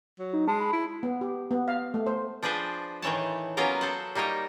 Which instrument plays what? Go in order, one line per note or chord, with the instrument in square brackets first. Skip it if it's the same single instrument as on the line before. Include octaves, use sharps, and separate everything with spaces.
[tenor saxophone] F#3
[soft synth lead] D#4
[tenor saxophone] G#3 [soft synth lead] A5
[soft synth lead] B5
[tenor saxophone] E4
[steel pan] B3
G4
B3
F5
A3
C5
[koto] F3 D4 G#4 B4 C5
A2 D#3 E3 C#5 A5
F#3 A#3 B3 C#4 F4 A#4
A4 C5 F#5
G3 A#3 D#4 C#5 D#5